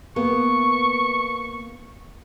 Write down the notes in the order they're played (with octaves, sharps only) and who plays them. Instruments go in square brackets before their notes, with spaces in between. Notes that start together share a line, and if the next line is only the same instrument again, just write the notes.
[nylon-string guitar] A#3 B3 [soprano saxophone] C#6